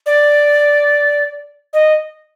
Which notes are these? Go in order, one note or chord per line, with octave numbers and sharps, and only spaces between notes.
D5
D#5